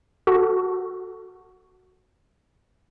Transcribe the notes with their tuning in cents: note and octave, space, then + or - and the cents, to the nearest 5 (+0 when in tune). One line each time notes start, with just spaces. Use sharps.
F#4 +0 A4 +5